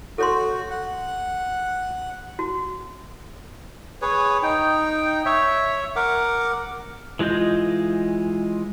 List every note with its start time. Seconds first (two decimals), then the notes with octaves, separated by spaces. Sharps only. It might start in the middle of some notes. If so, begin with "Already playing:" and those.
0.18 F#4 A4 C#5 C6
0.70 F#5
2.39 F#4
4.02 G#4 B4 C#5
4.43 D#4 G5
5.26 C#5 E5
5.96 A#4 F#5 D6
7.19 E3 G#3 F4 D#5 G6